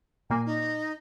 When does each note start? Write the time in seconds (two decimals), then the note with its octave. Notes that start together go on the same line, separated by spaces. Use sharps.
0.30 A#2 A#3 G#5
0.45 D#4